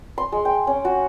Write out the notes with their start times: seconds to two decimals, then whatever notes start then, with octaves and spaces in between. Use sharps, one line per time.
0.18 C6
0.32 G#3
0.45 G5
0.67 C#4
0.85 F#4